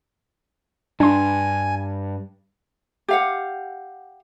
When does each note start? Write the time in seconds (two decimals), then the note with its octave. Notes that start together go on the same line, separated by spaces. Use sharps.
1.00 G2 D4 G#5 C6
3.08 G4 F5 F#5